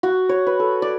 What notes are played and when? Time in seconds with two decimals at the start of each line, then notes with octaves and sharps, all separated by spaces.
0.03 F#4
0.29 C#5
0.47 B4
0.60 A4
0.82 D5